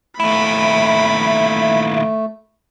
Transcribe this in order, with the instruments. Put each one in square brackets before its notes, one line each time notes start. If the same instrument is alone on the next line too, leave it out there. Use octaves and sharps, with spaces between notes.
[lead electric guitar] D#2 E4 [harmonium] A3 [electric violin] B5